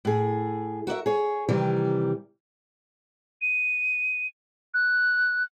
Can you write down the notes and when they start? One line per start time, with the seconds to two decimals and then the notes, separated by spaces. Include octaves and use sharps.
0.05 A2 G#4
0.87 F#4 A#4 D5 E5
1.06 G#4 C#5
1.49 C3 D#3 E3 G3
3.41 D#7
4.74 F#6